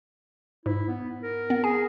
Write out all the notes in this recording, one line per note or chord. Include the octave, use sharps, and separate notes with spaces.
G#2 E4
B3
A#4
B3
G#4 G#5